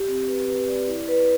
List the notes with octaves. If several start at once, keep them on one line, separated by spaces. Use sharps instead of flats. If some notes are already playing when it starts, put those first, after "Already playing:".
Already playing: G4
C4
B4
B4
D5
E4
B4